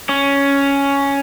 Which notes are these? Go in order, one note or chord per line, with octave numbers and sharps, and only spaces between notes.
C#4